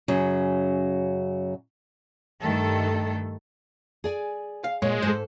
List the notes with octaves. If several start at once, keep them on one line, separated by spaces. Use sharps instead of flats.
F#2 C#3 F#3
G2 D#3 A3 A4
G#4 D5 G#5
F5
A#2 G#3 C#5
G#2 A4 C5